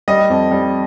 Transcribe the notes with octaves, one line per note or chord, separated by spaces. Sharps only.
G3 D#5
F2
G3